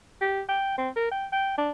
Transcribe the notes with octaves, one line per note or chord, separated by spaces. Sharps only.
G4
G5
C4
A#4
G5
G5
D4